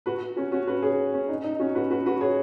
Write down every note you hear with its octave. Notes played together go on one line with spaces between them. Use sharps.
F#4 B4
C#4 F#4
C#4 F#4
F#4 B4
G#4 C#5
C#4
D#4
D#4
C#4 F#4
F#4 B4
F#4 B4
F#4 B4
G#4 C#5